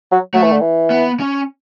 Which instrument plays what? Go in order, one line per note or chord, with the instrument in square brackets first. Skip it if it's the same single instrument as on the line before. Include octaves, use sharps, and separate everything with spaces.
[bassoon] F#3
[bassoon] F#3 [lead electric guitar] A3
[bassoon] E3
D3
E3
[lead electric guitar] B3
C#4